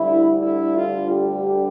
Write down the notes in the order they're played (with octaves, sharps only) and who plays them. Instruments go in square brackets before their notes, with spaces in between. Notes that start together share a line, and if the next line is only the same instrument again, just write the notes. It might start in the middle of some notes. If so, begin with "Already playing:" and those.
Already playing: [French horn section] D2 D3 G3 E4
E4
F4
G4